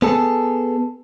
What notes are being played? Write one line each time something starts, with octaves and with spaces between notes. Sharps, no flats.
B3 G#4 A4